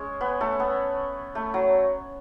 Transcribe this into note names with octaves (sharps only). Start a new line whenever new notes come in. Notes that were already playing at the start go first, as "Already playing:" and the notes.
Already playing: G#3 C#4 G#4 C#5
B3 B4
A3 A4
B3
A3
F#3